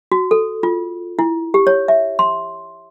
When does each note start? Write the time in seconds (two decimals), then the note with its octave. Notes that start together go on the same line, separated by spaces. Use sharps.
0.12 F#4
0.31 A4
0.63 F4
1.19 E4
1.54 G4
1.67 C#5
1.88 E5
2.19 C6